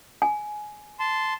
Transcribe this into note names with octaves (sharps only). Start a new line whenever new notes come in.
G#5
A5 C6